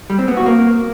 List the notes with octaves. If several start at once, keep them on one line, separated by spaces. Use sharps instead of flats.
G3
C4
B3
F#4
A#3